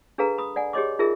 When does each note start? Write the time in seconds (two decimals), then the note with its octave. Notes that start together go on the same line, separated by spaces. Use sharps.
0.18 D4 G#4 A4 B4 F5 A#5
0.38 B5 D#6
0.56 D5 F#5 G#5
0.73 G4 G#4 C#5 D#5 C6 D6
0.99 D#4 F4 G#4 A#4 E5